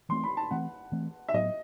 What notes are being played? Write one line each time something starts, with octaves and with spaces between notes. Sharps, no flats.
E3 A3 C4 C6
B5
A5
E3 A3 C4 F#5
E3 A3 C4
E5
A2 F#3 B3 D#5